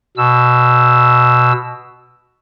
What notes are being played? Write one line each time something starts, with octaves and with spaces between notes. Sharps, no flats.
B2 E6